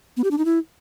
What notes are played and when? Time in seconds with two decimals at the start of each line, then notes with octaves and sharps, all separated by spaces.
0.17 B3
0.24 G4
0.31 D4
0.38 D#4
0.45 E4